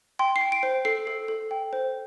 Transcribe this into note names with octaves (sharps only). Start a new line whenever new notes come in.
G5 C6
C7
G5
D7
C5
A4 C7
A4
A4
G5
C5